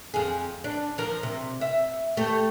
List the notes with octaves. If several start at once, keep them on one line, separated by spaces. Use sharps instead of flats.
F2 G#4
D4
F3 A#4
C3
E5
A3 G4